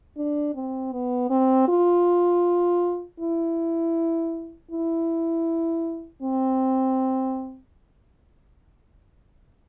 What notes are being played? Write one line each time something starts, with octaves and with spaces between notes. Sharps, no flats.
D4
C4
B3
C4
F4
E4
E4
C4